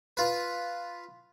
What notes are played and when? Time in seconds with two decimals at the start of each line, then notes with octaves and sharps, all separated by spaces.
0.17 F4 B4